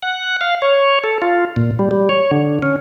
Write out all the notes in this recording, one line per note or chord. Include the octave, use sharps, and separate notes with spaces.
F#5
F5
C#5
A4
F4
A#2
G3
G3
C#5
D3
C#4